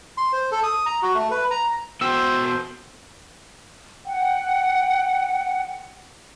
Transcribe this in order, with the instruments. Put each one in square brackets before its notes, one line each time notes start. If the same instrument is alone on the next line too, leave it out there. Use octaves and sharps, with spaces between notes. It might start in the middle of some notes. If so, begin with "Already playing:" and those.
[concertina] C6
C5
A4
D#6
A#5
F#4
A3
B4
A#5
[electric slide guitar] B3 F#4 G5 [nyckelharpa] C5 [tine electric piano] E6
[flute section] F#5 G5